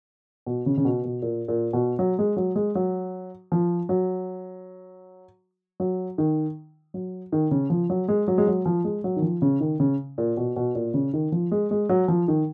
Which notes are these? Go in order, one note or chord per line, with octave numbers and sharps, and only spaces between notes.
B2
C#3
C#3
B2
B2
A#2
A#2
B2
F#3
G#3
F#3
G#3
F#3
F3
F#3
F#3
D#3
F#3
D#3
C#3
F3
F#3
G#3
F#3
G#3
F#3
F3
G#3
F#3
D#3
F3
C#3
D#3
C#3
A#2
B2
B2
A#2
C#3
D#3
F3
G#3
G#3
F#3
F3
D#3